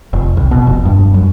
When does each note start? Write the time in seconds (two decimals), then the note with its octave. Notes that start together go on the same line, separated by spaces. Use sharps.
0.13 F1
0.37 C2
0.51 B2
0.67 F1
0.85 G2
1.14 F#2